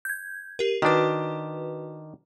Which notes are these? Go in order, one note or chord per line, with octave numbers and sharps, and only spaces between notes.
G6 G#6
G4 A#4
D#3 D4 F#4 B4